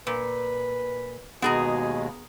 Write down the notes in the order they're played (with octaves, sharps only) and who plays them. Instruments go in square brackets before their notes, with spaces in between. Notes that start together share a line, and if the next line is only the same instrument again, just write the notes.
[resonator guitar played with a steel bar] A#2 [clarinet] B4
[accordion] D#2 B2 G#3 [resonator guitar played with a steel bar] B3 G#4 A#5 [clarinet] G#5